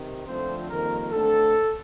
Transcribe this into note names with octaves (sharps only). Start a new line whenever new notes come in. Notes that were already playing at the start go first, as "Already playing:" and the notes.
Already playing: C3 D#3
F2 D3 F3 A3 C4 C5
F2 D#3 G3 A#3 A#4
D3 A3 C4 A4